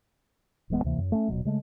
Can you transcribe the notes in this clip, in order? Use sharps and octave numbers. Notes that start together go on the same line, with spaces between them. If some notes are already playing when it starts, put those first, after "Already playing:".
D1 E3 G#3 B3
D2 C3 E3 A#3
F#2
A3 C#4
D#1 B2 F#3
C#3 G#3 A3